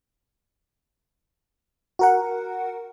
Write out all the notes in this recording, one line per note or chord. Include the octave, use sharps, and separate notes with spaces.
F#4 A#4 F#5